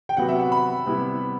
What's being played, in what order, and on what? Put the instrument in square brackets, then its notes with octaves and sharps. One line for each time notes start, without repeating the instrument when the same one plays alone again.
[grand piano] G5
[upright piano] C3 F#3 B3 F#4 [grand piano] F#5
[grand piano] E5
F#5
B5
[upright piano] C3 G3 B3 E4